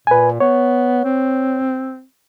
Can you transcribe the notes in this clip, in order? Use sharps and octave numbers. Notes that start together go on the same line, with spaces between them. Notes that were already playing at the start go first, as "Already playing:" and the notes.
A#2 B4 G#5
B3 C#5
C4